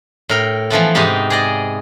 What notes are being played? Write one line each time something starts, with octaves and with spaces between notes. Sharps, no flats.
A2 A#4 G5
E3 F3 A3 B3
G#2 C3 B3 D#4 G4
G#4 D5 D#5